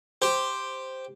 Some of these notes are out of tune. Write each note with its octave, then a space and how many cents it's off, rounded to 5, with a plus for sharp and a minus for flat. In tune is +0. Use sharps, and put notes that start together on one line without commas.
G4 +0 C5 +0